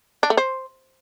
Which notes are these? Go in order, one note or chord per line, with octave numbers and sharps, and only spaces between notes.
D4
A3
C5